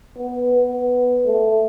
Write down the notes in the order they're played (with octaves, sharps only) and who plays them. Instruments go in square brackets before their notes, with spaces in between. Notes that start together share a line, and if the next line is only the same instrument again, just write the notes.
[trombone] B3
B3
A3